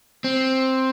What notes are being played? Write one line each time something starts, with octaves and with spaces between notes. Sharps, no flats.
C4